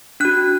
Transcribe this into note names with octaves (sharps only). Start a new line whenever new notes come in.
D4 F#4 F#6